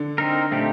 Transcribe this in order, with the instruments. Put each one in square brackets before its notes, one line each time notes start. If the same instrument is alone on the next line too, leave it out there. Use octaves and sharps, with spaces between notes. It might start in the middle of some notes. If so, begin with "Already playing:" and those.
Already playing: [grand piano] D3
[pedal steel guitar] C4 D#4 A#4
[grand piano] A#2 [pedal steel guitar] A3 C4 D#4 G4